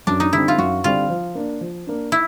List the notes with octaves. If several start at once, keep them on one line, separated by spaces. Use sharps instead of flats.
F#2 D4
D#4
D3 G3 C4 E4
F4
F#2 F#4
D3 G3 C4 F4
F3
A#3 D4
F3
A#3 D4
E4